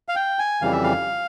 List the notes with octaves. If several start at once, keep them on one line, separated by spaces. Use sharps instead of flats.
F5
G5
G#5
F2 C#3 E3 G3 F5
E5
F5